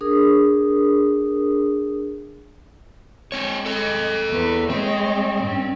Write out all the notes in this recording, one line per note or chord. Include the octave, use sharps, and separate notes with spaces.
D4 G#4 A#4 D#6
G#3 C4 C#5
A4 D#5
E2 B4
G#3 C4 C#5
G2 C#4